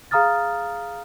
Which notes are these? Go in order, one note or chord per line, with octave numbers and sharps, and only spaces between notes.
G#4 F5 A#5 D#6 F6 A6